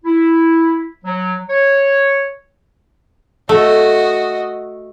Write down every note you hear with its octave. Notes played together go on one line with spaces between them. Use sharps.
E4
F#3
C#5
A3 F#4 D#5